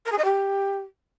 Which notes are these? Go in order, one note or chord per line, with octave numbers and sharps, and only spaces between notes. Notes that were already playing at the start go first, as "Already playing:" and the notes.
A#4
G#4
D#5
G4